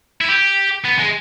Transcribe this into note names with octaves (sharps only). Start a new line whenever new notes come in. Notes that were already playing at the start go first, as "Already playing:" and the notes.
E4
G4
B3
G#3